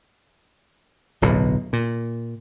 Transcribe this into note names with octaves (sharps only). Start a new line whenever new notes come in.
D1 B1 B2
A#2